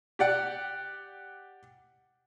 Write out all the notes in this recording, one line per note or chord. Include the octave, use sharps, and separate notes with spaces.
G4 D5 F#5